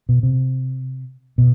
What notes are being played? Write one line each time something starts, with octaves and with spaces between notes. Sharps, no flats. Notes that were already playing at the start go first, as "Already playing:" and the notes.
B2
C3
B2